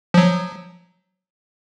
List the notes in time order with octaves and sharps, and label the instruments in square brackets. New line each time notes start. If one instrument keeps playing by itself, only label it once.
[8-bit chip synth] F3 F#3